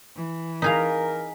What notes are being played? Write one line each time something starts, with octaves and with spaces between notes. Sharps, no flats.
E3
D#4 G#4 A#4 F5 G#5 A#5 B6